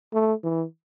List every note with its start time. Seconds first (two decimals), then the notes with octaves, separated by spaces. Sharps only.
0.13 A3
0.43 E3